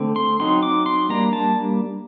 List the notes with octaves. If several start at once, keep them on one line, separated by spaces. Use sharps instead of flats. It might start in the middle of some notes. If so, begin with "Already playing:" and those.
Already playing: D3 A3 C4
C6
F#3 C4 D#4 C6
D6
C6
G3 A#3 D4 A#5
A5